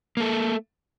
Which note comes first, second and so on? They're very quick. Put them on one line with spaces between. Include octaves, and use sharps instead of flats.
A#3 A4 A3